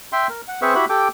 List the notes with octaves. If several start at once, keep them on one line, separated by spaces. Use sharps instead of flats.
E5 G5 C6
A#4
F#5
C4 G#4 B4 C5 E5 C#6
E4 F#4 G4 E5 F#5 B5
G4 A4 G5 D6